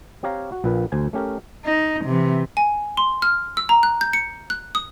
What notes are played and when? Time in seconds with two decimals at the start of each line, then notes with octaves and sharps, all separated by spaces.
0.23 C4 G4 C#5 F5 A#5
0.52 F#4
0.64 A#1 A#2 B4
0.92 D2 C5 G#5
1.13 A3 C#4 G4 A#4
1.65 D#4
2.05 C3 E3
2.57 G#5
2.97 C6
3.22 F6
3.57 E6
3.69 A#5
3.83 F#6
4.01 G6
4.13 C#7
4.50 F#6
4.75 D#6